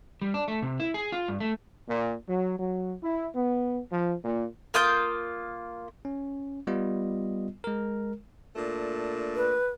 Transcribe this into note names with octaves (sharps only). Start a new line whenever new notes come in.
G3
D4
A3
C3
E4
G#4
F4
G2
A3
A#2
F#3
F#3
E4
B3
F3
A#2
A#3 F4 D#6 G6
C#4
G3 B3 F4 D#5
G#3 A#4
A#2 A3 D4
B4